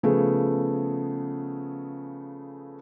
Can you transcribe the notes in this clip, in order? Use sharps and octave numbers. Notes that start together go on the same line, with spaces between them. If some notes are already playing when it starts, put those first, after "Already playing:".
C#3 F3 A3 B3 G#4